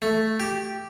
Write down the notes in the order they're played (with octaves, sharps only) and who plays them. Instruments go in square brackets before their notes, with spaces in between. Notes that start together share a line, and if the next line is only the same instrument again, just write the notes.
[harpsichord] A3
G4